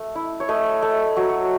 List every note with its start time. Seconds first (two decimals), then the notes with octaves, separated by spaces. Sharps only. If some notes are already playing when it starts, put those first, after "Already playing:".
Already playing: A3 F#5
0.15 E4
0.40 C#5
0.49 A3 D#5
0.82 A3
1.16 F#3 C#5